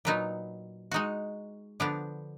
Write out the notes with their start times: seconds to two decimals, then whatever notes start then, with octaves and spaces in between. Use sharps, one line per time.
0.05 A#2 F#3 B3 D#4
0.91 G#3 D#4 F#4
1.80 D3 F3 B3 D4